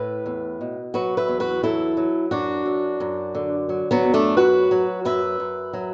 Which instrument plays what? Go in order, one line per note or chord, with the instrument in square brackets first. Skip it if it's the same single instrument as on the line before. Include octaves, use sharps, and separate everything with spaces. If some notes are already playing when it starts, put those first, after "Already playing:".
Already playing: [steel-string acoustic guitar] A2 B4 E5
E2
B2
F#3 F#4 B4
B4 E5
E2
F#4 B4
F#3 E4 A4
F#3
F#2 D4 F#4
F#2
F#2
D3
F#3
F#3 B3
F#2
A3 D4
F#3 F#4 B4
F#3
F#2 B4 E5
F#2
F#3